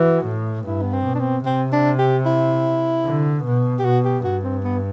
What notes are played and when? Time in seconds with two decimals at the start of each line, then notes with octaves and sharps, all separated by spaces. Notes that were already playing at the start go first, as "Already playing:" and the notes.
Already playing: E3 F#4
0.26 A2
0.66 G2 E4
0.82 B3
0.93 C4
1.06 B2
1.15 D4
1.19 C4
1.45 C3 C4
1.73 D4
1.99 G4
2.26 E4
3.05 D3
3.45 B2
3.79 G4
3.85 B2 F#4
4.05 G4
4.24 G2 F#4
4.44 C4
4.64 B3